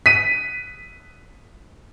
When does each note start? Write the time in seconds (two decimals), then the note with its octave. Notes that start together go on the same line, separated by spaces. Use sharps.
0.06 B6 D#7